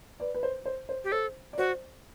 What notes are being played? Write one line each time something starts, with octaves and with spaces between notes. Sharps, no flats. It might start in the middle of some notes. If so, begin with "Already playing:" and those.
B4 D5
B4
C5
C5
C5
G4
A4 C5
D5
F#4 C5